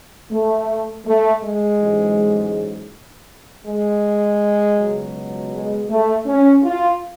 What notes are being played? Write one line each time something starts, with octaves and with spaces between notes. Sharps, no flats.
A3
A3
G#3
A1 G#2 F#3
G#3
C#2 B2 F#3
G#3
A3
C#4
F4